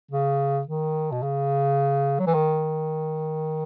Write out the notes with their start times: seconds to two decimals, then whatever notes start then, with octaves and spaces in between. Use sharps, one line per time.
0.11 C#3
0.67 D#3
1.12 B2
1.23 C#3
2.19 F#3
2.27 E3
2.35 D#3